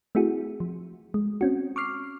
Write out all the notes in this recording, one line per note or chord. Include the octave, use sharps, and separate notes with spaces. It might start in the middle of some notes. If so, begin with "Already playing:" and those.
A3 C4 E4 F#4 G#4
F3
G#3
C4 C#4 F#4
C#6 D6 F6 C7